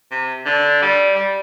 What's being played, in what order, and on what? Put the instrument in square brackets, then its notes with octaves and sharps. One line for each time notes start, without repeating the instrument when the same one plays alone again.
[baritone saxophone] C3
D3
G3
G3